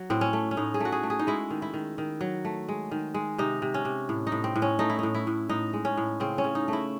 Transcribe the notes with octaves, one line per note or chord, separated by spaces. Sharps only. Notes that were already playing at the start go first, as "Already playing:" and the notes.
Already playing: F#3
A2 C4
C#4
A3
C#4
A2 D#4
G#4
A3 F#4
G#4
A3
G#4
D#4
G#3 E4
D#3
E4
D#3
D#3
F#3
A3
G#3
D#3
G#3
C3 D#4
C3
C#4
C3
A2
D#4
A2
C4
A2
C#4
A3 D#4
E4
A2 D#4
E4
A2
A2 D#4
G#3
C#4
A2
C#3 C4
C#4
C#3
D#4
A3
E4